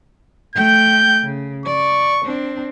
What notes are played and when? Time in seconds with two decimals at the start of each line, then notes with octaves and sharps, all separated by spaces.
0.55 A3 G5 G6
1.24 C#3
1.66 D5 C#6
2.24 C4 D4